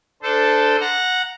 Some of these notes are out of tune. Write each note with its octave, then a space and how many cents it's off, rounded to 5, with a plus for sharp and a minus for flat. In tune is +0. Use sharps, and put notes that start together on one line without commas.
D4 +0 A4 +0 C5 -20
F#5 -10 A#5 +0